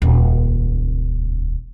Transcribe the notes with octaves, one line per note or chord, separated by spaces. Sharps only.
D#1 C#2